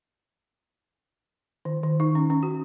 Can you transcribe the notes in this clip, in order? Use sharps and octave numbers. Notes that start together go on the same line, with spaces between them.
D#3
D#3
D#4
C#4
C#4
F#4